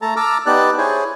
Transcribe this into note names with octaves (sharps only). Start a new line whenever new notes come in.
A3 A4 A5 A#5
A5 A#5 D6 E6 F6
B3 D#4 G4 D5 A5 F#6
E4 G#4 C5 C#5 G#5